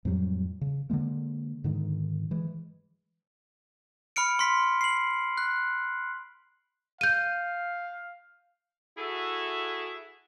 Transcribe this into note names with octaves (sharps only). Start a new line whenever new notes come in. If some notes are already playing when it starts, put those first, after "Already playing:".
F2 A2 F#3 G3
C#3
D3 F3 G#3 A#3
G#2 D3 D#3 G#3
E3 G#3
B5 F6 C#7 D7
C6 B6
C7 F#7
F#6
F5 G6 D#7
E4 F#4 G#4 A4 E5